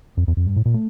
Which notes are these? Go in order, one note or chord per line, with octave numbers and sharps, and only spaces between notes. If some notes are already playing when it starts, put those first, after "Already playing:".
F2
E2
F2
G2
A2
A#2
A3